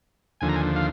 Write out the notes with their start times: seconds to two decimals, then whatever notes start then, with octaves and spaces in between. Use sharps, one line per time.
0.41 D#2 D3 F3 G#5
0.49 A#5
0.56 G#5
0.76 F5